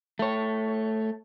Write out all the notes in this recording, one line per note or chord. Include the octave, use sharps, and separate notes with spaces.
A3 C#5